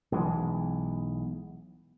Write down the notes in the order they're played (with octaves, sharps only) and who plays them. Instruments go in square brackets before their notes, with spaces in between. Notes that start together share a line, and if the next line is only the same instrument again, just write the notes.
[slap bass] B1 E3 G#3